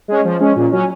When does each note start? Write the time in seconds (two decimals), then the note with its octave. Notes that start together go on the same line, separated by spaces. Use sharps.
0.08 G#3 C#4
0.24 F3
0.40 G#3 C#4
0.56 A#2
0.72 F#3 C#4